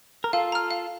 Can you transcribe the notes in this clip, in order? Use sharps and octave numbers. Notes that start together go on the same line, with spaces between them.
A#4
F4 A4 F5
A#5 F6
F5